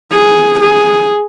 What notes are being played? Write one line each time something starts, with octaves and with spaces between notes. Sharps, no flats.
G#4
G#4